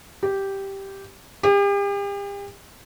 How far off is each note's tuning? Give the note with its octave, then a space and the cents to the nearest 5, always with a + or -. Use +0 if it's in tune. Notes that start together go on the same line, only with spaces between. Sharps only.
G4 -5
G4 +40